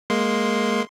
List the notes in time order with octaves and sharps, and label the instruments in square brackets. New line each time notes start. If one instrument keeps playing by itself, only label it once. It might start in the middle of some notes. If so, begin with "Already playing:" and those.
[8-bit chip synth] G#3 A#3 C6